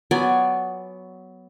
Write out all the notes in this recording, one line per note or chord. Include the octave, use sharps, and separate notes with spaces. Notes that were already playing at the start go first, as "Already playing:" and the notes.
F#3 B3 D5 G#5